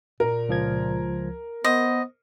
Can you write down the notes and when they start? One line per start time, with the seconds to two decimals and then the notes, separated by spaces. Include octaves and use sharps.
0.20 A#2 A#4
0.49 C#2 F3 G#6
1.65 B3 C5 D#5